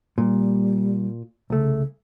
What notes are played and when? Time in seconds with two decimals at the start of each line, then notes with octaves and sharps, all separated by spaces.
0.18 A#2 G3
1.50 C2 C#3 A3